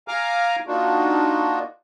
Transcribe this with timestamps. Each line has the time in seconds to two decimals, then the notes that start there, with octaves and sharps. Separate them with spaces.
0.08 F5 G#5 A#5 D6 F6
0.67 A#3 D4 D#4 F4 F#4